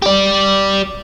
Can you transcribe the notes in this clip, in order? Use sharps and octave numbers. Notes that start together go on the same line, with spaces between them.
G4 D5